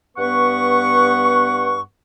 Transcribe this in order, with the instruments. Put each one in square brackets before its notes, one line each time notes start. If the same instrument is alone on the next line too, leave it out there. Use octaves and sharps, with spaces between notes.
[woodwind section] G2 B3 B4 F#5 C#6